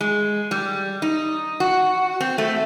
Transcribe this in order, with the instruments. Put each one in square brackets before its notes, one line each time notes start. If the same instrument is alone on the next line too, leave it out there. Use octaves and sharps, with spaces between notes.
[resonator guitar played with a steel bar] G#3
G3
D#4
F#4
C4
A3